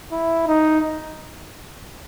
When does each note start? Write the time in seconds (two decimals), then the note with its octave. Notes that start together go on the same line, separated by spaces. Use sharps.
0.12 E4
0.47 D#4